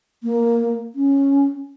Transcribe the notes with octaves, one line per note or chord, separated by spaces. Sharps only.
A#3
C#4